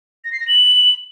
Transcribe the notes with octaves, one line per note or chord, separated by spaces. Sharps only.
A#6
C7
A#6
F#7